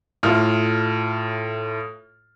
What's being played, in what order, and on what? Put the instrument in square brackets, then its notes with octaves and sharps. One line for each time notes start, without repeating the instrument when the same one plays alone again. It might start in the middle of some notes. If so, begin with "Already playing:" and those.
[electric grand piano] A2 F6 [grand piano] F4 A4